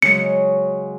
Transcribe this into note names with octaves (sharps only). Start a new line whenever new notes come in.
C#3 F#3 G#3 C#7